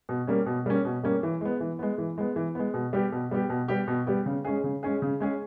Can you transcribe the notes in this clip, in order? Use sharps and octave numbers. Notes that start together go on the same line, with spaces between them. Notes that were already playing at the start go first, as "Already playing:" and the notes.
B2
G3 A#3 C#4
B2
G3 A#3 C#4
B2
G3 A#3 C#4
E3
G#3 B3
E3
G#3 B3
E3
G#3 B3
E3
G#3 B3
B2
G3 B3 G4
B2
G3 B3 G4
B2
G3 B3 G4
B2
G3 B3 G4
C#3
G#3 C#4 G#4
C#3
G#3 C#4 G#4
C#3
G#3 C#4 G#4